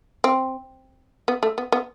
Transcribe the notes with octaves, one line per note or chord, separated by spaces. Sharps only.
C4
B3
A3
B3
B3